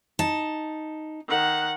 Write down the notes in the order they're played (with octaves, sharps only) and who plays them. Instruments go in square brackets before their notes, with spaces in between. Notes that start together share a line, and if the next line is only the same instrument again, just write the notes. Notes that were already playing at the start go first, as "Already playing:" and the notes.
[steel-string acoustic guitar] D#4 A5
[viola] D#3 F#5